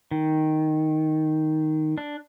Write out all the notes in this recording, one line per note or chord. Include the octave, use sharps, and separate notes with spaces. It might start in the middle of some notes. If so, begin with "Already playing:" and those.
D#3
D4